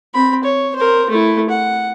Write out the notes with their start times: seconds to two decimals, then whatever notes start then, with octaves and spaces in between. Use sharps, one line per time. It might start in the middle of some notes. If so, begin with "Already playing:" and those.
0.14 C4 B5
0.43 C#5
0.76 A#4 C5
1.10 A3 E4
1.49 F#5